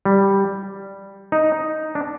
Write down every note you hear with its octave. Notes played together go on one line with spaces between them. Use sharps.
G3
D#4
D4